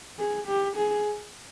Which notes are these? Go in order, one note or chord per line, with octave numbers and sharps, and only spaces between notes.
G#4
G4
G#4